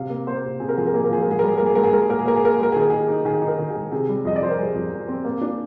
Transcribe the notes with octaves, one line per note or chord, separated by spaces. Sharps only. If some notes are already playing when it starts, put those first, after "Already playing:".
Already playing: C3 F5
A#3
A#3 C5
C3
C3 G#4
A#4
F3 G#4
A#4
A#3 G#4
A#4
F3 G#4
A#4
G#2 G#4
A#4
G3
G#4
A#3 A#4
G#4
G#2 A#4
G#4
G#2 A#4
G#4
A#3 A#4
G#4
A#3 A#4
G#4
A#3 A#4
G#4
G#3 A#4
G#4
D#3 A#4
D#4 G#4
D#4
D#3 G#4
D#4
A#4
D#3
G#4
G#3
C3 G#4
G3
F2 D#5
D5
F2 C5
A#4
G3 G#4
F2
F2
C4
A#3
D4